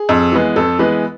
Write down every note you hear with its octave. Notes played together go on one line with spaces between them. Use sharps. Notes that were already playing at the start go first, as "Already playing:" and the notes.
Already playing: G#4
F2
E3 G#3 B3
F2 A4
E3 G#3 B3 B4